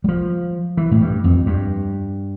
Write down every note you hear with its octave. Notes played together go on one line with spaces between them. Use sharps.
G3
F3
E3
A2
G2
F2
G2